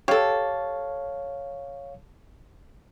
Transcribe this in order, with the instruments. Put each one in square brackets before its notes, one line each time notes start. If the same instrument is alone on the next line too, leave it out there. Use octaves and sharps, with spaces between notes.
[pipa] G4 A4 [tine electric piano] C#5 F5